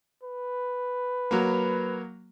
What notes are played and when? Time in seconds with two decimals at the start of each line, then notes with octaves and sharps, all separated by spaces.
0.23 B4
1.31 F#3 A#3